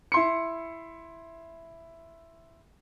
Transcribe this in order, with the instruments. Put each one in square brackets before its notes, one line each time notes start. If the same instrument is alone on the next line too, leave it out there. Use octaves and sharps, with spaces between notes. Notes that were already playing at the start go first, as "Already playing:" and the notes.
[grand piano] E4 C6 C#7